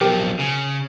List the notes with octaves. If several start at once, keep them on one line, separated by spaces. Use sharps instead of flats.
B1 F3 G4 A#4 G5
C#3